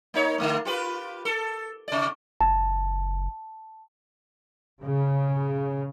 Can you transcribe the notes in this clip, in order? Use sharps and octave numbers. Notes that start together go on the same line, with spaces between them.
A#3 D#4 C#5
D3 A3 A#3
F4 G4 B4
A4
C3 D5
F#1 A5
C#3